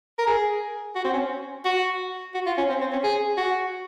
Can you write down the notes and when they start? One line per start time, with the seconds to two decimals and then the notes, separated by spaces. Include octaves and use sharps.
0.19 A#4
0.27 G#4
0.95 F#4
1.04 C4
1.13 C#4
1.65 F#4
2.34 F#4
2.46 F4
2.58 C#4
2.69 C4
2.81 C4
2.92 C#4
3.03 G#4
3.37 F#4